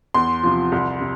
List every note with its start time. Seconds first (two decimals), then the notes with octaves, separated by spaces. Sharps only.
0.14 E2 C6
0.43 C3 F3
0.72 C2
1.01 C3